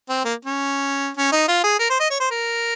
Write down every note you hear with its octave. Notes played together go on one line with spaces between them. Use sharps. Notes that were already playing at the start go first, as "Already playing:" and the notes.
C4
A#3
C#4
C#4
D#4
F4
G#4
A#4
C5
D#5
C#5
C5
A#4